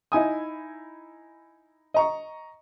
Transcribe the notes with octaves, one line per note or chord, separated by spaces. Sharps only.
D#4 E4 G#5 D#6
D#5 A#5 C#6